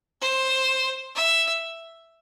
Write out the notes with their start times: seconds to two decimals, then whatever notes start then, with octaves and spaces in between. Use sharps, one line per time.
0.21 C5
1.16 E5